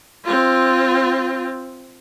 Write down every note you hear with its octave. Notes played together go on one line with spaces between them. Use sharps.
C4 F4